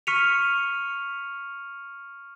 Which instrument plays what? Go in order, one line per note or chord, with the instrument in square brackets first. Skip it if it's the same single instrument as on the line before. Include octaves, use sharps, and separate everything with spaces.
[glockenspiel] C#6 F6 B6 C#7 D#7 F7